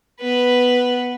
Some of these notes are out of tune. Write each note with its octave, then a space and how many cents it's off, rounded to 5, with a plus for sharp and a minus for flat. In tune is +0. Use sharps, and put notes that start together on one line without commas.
B3 +0 B4 +0